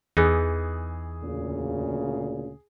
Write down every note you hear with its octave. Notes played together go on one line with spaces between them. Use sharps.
E2 E3 B3 D#4 G#4
D2 A#2 C#3